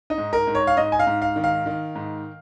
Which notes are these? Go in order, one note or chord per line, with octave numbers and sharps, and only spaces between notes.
D#4
G#2
A#4
G#2
C#5
F5
G#2 D#5
G#5
F5
G#2
F5
D#3
F5
D#3
G#2